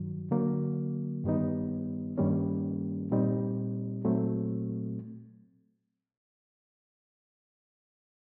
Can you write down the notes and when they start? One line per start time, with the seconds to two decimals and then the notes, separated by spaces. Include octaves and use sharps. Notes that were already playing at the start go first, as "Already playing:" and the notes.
Already playing: G2 D#3 F#3
0.31 D3 F#3 A#3
1.24 G2 D#3 G3 B3 D#4
2.18 G2 D#3 G3 A#3 C#4
3.11 A#2 G3 C4 D#4
4.04 A#2 F#3 A3 C4